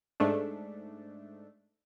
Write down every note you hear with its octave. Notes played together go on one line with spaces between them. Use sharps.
G#2 A3 D4